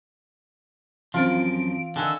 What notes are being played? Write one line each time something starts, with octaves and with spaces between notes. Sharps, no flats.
F#2 E3 F3 C4 F4 D7
D3 D#3 F#5 G#5 C#6 E6